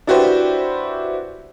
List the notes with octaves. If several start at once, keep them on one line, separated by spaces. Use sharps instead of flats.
D4 E4 F#4 G4 B4 C5